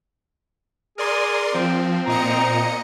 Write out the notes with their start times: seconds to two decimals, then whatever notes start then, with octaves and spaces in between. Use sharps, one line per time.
0.98 G#4 A#4 D5 C6
1.54 F3 C4
2.07 A#2 D#5 A#5 C#7